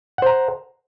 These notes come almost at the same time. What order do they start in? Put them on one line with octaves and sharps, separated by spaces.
F#5 C5 A#5